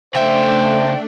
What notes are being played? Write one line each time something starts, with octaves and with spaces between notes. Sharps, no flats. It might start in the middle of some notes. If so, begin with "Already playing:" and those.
C#3 A3 D4 C5 E5 G5